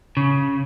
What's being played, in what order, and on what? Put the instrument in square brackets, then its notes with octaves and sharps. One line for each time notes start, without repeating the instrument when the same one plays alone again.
[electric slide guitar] C#3